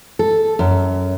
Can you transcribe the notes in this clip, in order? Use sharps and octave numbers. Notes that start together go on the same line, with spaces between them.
A4
F#2